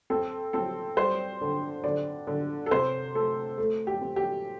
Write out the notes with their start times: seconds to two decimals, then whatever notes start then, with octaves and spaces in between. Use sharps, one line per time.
0.10 C4 A4
0.53 C4 A4
0.97 G3 C5
1.41 D3
1.84 D3 D5
2.27 D3
2.66 A4
2.71 C3 C5
3.15 A3 A4
3.58 A3
3.87 G4
4.01 C4
4.16 G4